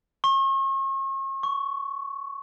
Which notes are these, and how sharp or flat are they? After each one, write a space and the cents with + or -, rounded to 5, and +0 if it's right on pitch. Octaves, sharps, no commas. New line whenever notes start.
C#6 -40
C#6 +15